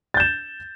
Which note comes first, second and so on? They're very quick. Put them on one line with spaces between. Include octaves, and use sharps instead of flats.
A6 G6 E7